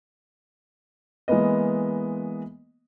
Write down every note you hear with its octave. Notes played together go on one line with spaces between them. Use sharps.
E3 G#3 A#3 B3 D#5